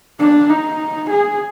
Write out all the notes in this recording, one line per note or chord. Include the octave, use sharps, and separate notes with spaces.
D4
D#4
G#4